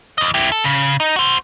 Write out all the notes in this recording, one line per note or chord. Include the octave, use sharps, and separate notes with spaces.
E3 D#5
E4 G4
A4
C#3
D#4
F#4 C5